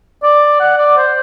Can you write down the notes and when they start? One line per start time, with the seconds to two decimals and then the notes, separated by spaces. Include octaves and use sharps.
0.23 D5
0.60 F#5
0.78 D5
0.97 C5